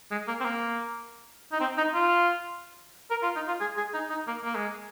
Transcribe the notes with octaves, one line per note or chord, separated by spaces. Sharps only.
G#3
A#3
C4
A#3
D#4
C4
D#4
F4
A#4
F4
D#4
F4
G#4
G#4
D#4
D#4
A#3
A#3
G#3